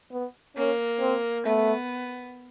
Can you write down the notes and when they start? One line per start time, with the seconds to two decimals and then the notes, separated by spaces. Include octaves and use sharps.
0.12 B3
0.56 A#3 C#4
1.00 C4
1.46 A3 B3